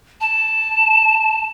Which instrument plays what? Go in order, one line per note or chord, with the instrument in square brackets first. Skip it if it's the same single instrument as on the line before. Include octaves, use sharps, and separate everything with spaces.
[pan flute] A5